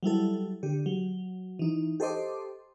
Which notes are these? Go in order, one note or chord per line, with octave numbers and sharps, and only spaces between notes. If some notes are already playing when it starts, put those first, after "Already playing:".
F#3 G3 E4 A4
D3 G4
F#3
E3 D#4
G4 A4 C5 D#5 C6 D6